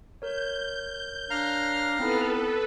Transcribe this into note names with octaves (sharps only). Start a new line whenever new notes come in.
A#4 C#5 G6
D4 F5 A#5 F6
B3 C4 D#4 E4 A4 B4